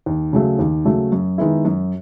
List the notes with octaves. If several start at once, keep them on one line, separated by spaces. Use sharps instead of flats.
D#2
C#3 F#3 A3
D#2
C#3 F#3 A3
F#2
D#3 G#3 B3 E4
F#2